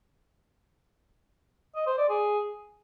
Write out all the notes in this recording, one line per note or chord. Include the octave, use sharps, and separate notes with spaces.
D#5
C5
D5
G#4